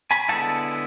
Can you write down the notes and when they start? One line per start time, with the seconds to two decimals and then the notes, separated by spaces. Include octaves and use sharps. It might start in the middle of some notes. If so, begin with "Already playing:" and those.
0.11 G#5 B5
0.29 D3 G#3 B3 E4 F#5 A5